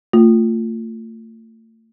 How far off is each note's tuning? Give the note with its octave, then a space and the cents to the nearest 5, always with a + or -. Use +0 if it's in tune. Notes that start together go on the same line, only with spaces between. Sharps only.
A3 +35 F4 +0